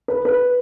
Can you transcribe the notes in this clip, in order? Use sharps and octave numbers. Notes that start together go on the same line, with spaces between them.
B4
B4